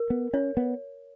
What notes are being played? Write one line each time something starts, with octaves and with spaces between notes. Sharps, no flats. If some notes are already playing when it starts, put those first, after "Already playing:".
Already playing: A#4
B3
C#4 C#5
B3